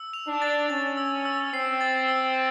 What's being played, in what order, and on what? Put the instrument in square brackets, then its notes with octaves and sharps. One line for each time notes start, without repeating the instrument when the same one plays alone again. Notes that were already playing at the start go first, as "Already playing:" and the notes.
Already playing: [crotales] E6
F7
[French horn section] D4
[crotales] A6
[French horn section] C#4 [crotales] A6
[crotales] E6
E6
[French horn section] C4 [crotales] C7
[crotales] A6
E6